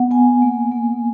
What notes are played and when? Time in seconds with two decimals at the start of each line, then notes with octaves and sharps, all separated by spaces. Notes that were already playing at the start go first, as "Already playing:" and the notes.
Already playing: B3 F#5
0.11 B3 G#5
0.42 A#3
0.72 A#3